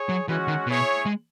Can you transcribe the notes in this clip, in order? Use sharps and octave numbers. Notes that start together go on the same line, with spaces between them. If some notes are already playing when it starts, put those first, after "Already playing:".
Already playing: G#4 C#5
F#3
E3 G#3 C#4 F#4
D#3
B2 E4 G#4 C#5
G#3